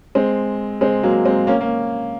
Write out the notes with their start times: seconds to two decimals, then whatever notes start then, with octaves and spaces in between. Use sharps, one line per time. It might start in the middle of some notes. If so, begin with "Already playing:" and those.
0.15 G#3 C4
0.81 G#3 C4
1.03 F#3 A#3
1.25 G#3 C4
1.47 A#3 C#4
1.61 A#3